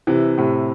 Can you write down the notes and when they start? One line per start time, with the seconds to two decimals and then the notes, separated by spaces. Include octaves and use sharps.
0.07 C3 E3
0.38 A2 C3